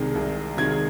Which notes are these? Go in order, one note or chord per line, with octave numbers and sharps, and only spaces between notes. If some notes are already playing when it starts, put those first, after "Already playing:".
Already playing: C2 C3 D#3 G#3
C2
C3 D#3 G#3 G#6